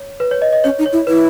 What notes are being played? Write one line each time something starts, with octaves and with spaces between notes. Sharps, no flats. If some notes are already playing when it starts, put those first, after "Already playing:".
Already playing: C#5
B4
C#5
D#5
D#5
C#4 C#5
D#4
C#5
E4
E4 B4